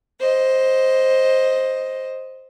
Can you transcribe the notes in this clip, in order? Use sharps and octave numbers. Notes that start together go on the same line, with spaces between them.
C5 D#5